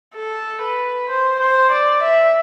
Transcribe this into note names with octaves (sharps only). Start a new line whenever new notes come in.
A4
B4
C5
C5
D5
E5